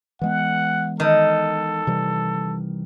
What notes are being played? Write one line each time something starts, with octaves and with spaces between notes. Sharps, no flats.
E3 G#3 B3 F#5
D#3 A4
C3 E3 G3